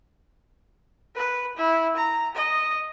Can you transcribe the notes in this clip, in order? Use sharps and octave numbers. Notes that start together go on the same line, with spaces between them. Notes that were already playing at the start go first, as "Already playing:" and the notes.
B4
E4
A#5
D#5